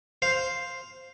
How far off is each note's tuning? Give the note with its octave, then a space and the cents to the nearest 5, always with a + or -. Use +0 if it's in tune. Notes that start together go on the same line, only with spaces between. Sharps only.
C5 +0 F5 +0